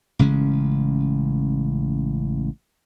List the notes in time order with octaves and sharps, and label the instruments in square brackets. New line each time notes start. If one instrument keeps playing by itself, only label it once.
[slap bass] A1 C#3 G#3 C#4